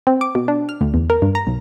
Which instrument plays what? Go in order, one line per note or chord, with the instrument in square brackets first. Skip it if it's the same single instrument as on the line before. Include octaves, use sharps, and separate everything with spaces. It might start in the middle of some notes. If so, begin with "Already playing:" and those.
[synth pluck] C4
D6
B2
D4
F6
D2
E2
A#4
G2
A#5
B1